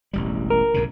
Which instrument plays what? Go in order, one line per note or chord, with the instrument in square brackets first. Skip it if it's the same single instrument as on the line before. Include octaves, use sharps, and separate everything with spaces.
[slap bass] E1 A1 G3
[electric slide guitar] A#4
[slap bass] B1 G2 C#3